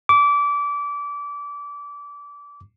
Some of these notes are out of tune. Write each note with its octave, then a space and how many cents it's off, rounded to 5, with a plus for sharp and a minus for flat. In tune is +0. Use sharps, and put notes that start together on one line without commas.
D6 -25